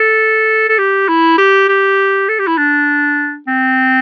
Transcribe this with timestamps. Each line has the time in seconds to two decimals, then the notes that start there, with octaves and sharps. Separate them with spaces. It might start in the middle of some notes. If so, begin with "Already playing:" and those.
Already playing: A4
0.69 A4
0.78 G4
1.09 E4
1.38 G4
1.69 G4
2.28 A4
2.39 G4
2.47 E4
2.58 D4
3.47 C4